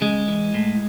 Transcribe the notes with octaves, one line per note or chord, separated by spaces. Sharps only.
C#3 G#3
E3
A2